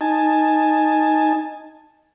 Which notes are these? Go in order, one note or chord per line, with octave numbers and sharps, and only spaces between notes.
D#4 G#5 A5